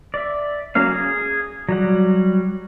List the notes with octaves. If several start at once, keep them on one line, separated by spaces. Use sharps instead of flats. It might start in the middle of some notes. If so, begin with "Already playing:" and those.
D5 E5
F#3 A#3 C#4 F5
G#4
F#3 G3 F#5